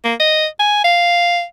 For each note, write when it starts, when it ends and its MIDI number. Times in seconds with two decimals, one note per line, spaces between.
0.04 0.14 58
0.19 0.46 75
0.59 0.83 80
0.84 1.43 77